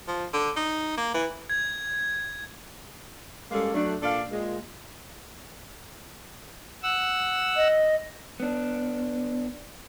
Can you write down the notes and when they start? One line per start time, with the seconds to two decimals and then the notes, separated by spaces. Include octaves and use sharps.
0.07 F3
0.33 D3
0.56 D#4
0.97 A#3
1.14 E3
1.50 G#6
3.51 G3 G#3 A#3 C#4 G#4 A4
3.74 F#3 A3 D4
4.03 A#2 D4 A4 D5 F5
4.30 A#2 G#3
6.83 F#5 E6
7.56 D#5
8.40 B3 D4